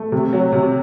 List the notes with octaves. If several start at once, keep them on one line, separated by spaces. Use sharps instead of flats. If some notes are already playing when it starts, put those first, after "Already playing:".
Already playing: A3
C3
F#3
C3